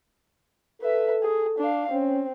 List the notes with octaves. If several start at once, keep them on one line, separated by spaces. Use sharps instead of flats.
A4 B4 E5
G#4
D4 F5
C4 C#4